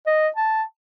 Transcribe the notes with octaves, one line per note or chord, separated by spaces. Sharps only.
D#5
A5